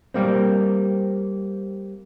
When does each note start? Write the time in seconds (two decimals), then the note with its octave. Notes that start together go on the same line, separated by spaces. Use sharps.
0.14 G3 A#3 C4